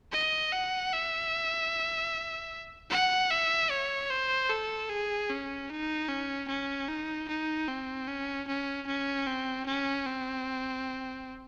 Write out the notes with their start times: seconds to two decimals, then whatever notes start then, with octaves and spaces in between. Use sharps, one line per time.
0.12 D#5
0.52 F#5
0.92 E5
2.90 F#5
3.31 E5
3.70 C#5
4.10 C5
4.49 A4
4.89 G#4
5.30 C#4
5.69 D#4
6.09 C#4
6.48 C#4
6.88 D#4
7.28 D#4
7.68 C4
8.08 C#4
8.47 C#4
8.87 C#4
9.27 C4
9.66 C#4
10.06 C4